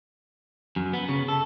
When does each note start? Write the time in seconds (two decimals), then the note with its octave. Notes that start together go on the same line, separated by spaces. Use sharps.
0.76 F#2
0.93 B3
1.09 C#3
1.28 A4